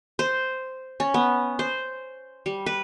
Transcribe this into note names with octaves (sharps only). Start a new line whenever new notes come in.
C5
C#4
B3
C5
G3
B4